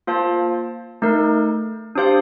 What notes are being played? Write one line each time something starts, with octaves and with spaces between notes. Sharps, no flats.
A#3 F4 C5 F5 A5
A3 D#4 A#4
D4 G4 C5 F5